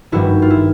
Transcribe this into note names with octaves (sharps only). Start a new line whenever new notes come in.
G#1 G2 D#3 G3 E4 F#4
F4
E4